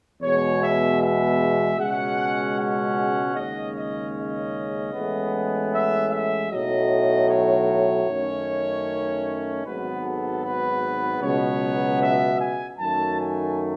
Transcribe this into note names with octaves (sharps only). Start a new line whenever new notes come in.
E2 B2 G#3 B3 C#5
E5
E5
C#2 B2 G#3 C#4 F#5
F#5
D#2 C#3 G#3 C#4 D#5
D#5
D#5
A1 A2 G#3 B3
E5
E5
B1 A2 F#3 D#5
C#5
F#2 D#3 A3 C#4
G#1 G#2 F#3 B3 B4
A4
B4
C#2 B2 F#3 B3 C#5
E5
G#5
F#2 D#3 F#3 A3 A5
G#5